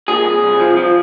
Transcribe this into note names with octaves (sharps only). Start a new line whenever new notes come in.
A#2 G#4
C2
C2
F3
F3